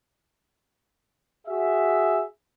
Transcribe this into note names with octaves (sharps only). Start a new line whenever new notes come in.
F#4 G#4 E5